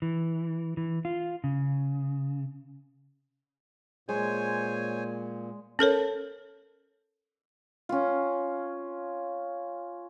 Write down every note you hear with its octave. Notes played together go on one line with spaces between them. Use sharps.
E3
E3
F4
C#3
A#2 G#3 C5 C#5 G#5
C#4 A4 A#4 C#5
C#4 F4